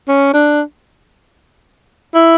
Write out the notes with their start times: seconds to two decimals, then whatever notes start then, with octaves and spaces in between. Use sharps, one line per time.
0.08 C#4
0.34 D4
2.14 E4